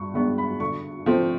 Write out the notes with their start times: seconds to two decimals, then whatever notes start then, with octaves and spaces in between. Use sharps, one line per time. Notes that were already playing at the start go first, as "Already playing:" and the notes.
Already playing: G2 C#6
0.14 D#3 G#3 B3 D4 C#6
0.38 B5
0.60 D3 C#6
1.06 F3 A3 C4